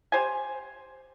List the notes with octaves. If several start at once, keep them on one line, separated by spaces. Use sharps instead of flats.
G4 C5 G#5